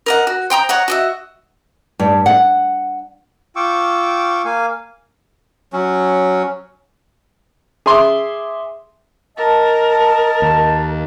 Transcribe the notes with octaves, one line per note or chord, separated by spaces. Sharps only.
A#4 D#5 F#5
F#4
C5 G5 A#5 D#6
C#5 D#5 F#5 A#5
F#4 D#5 E5
G2
F#5
F4 G5 C#6 D6 E6
A#3 F5 G#5
F#3 C#4
G#4 E5 C6 D6 D#6
A#4 D#5 A5
D#2